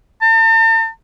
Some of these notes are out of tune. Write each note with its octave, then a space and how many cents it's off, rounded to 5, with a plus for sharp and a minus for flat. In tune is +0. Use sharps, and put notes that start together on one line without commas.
A5 +45